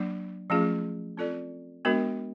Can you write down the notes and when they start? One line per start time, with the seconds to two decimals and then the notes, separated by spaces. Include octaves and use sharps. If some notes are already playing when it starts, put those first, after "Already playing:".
Already playing: F#3 A#3 D4
0.50 F3 A3 C#4 F4 G#4
1.17 C4 F4 A4 D5
1.85 G#3 B3 D4 F#4 A#4